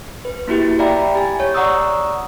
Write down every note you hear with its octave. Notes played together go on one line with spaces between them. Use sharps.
B4
A#3 E4 F#4 G4
D5 E5 F5 G5 A#5 B5
G4 G#5
C#5
D5 F#5 A#5 C#6 D#6 E6